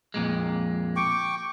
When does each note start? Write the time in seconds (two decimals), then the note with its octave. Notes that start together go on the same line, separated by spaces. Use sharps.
0.14 F2 A#2 G#3
0.96 G5 C#6 D6